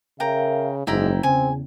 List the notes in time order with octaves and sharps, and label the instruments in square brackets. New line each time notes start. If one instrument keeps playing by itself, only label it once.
[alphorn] C#3 [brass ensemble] A#4 E5 F5 [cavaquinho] G5 A#5
[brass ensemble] F#1 [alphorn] G#2 [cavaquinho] E4 G5 A#5
[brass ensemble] E2 C#3 [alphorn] C4 [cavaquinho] G#5